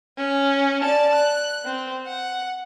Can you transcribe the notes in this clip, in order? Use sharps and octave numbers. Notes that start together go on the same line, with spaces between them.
C#4
D5 A5
F#6
C4
F#5